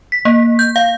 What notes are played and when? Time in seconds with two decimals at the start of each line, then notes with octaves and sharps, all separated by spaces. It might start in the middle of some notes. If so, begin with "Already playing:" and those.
0.12 B6
0.25 A#3
0.59 G6
0.76 F5